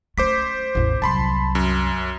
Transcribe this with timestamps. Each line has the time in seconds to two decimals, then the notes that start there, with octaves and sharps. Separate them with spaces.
0.18 A3 C#4 C5 D6 B6
0.75 A1 E2
1.02 C2 F#3 A5 B5 C6
1.55 F#2